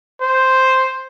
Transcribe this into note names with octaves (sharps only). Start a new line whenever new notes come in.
C5